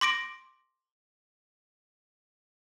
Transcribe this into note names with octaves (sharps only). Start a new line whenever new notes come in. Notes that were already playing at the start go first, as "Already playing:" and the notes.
C6 D6 A#6 D7